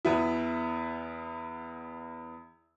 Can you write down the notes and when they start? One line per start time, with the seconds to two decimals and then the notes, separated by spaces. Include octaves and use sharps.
0.05 E2 B3 E4